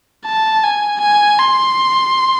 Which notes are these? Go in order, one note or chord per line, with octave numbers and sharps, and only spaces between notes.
A5
G#5
G#5
C6